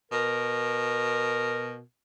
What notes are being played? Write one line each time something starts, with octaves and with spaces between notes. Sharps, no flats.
B2 A#4